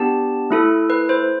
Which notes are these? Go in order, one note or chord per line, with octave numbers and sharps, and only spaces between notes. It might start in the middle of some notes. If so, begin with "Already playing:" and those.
Already playing: B3 D4 G4 A5
A3 E4 A4
B4
C5